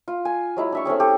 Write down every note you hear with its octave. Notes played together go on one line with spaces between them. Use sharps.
F4
G#5
F#3 G#3 E4
D4 E5 C#6
A3 C4 C#4 G#4
G4 A4